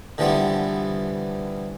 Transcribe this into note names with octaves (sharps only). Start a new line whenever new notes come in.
D3 E3 F3 G3 B3